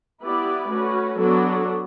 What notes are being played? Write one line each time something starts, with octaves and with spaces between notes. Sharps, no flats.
B3 E4 G4 B4 D5
A3 C#4 F#4 B4
F#3 B3 D4 F#4 A4